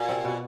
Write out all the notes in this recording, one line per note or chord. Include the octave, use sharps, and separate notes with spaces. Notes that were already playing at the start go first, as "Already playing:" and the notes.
Already playing: A#2 F#4
C3 C4
B2 B3